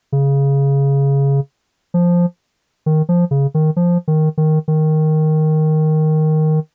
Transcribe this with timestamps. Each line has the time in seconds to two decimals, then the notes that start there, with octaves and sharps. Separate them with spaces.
0.12 C#3
1.94 F3
2.86 D#3
3.09 F3
3.31 C#3
3.54 D#3
3.76 F3
4.08 D#3
4.38 D#3
4.68 D#3